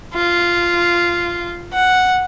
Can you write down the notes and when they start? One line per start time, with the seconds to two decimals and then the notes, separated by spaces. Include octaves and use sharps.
0.14 F4
1.73 F#5